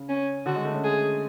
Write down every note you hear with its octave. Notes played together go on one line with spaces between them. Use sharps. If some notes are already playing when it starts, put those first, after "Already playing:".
Already playing: C#3
C#4
D3 F#4
G#3
A3
C#4
G#4